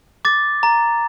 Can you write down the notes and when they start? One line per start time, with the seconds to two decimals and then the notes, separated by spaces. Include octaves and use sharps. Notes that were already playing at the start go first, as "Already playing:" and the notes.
0.25 D6 A6
0.63 A#5